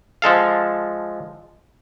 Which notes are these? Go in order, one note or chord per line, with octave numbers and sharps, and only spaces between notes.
F3 G#3 A4 F5